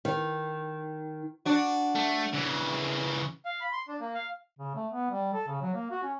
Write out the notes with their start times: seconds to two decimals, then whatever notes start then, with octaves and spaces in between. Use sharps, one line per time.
0.05 D#3
1.45 D4 F#4
1.95 A3
2.33 C#3 E3
3.45 F5
3.61 B5
3.73 C6
3.88 D4
4.00 A#3
4.15 F5
4.59 C#3
4.75 A3
4.92 B3
5.11 G3
5.34 A4
5.48 C#3
5.62 F#3
5.75 A#3
5.91 F#4
6.03 C#4